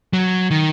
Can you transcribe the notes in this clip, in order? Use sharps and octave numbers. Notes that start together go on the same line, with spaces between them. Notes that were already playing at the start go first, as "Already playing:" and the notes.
F#3
D#3